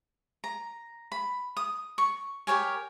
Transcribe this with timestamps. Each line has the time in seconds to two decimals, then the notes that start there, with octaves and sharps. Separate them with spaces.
0.44 A#5
1.12 B5
1.57 D#6
1.98 C#6
2.47 G4 A#4 C#5 G#5